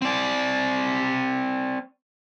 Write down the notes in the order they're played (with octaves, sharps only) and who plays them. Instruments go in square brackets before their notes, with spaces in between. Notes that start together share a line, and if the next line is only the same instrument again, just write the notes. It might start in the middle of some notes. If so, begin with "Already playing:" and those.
[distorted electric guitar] C4 D5